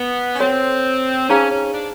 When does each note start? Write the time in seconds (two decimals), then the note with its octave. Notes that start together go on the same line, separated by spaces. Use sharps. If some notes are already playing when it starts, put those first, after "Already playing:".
Already playing: B3
0.36 C#4
0.40 C4 F#4 A4 C#5
1.29 C#4 D#4 G#4 C5 F5 A#5
1.51 C#4
1.73 D4